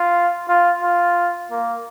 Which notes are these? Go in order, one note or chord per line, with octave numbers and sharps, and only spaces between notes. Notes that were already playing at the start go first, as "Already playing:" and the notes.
Already playing: F4
F4
F4
A#3